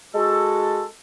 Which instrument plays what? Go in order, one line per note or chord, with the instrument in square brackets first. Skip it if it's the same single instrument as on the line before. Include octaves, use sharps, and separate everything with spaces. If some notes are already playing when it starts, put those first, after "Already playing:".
[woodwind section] G#3 F#4 A4